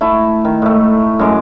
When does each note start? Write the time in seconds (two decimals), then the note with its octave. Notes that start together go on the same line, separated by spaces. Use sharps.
0.01 A3 E4 A5
0.45 D#3
0.62 A2 A3
1.19 F#2 G#3 D6